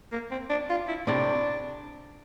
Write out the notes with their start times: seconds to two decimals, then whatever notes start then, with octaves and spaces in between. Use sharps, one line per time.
0.12 A#3
0.31 C4
0.50 D4
0.70 F4
0.88 E4
1.07 A2 C3 D4